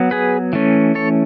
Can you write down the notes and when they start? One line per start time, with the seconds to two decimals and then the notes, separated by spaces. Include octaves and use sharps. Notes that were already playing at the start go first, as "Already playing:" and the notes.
Already playing: F#3 B3
0.11 G#4 B4
0.53 E3 A3 C#4
0.95 A4 C#5